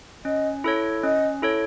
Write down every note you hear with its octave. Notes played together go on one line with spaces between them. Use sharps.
C#4 D#5
E4 A4 C#5
C#4 D#5
E4 A4 C#5